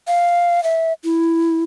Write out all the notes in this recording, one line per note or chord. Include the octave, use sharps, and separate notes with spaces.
F5
E5
E4